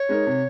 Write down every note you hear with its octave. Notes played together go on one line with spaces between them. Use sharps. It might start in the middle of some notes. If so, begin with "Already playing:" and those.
Already playing: C#5
G#3 D#4 A#4
C3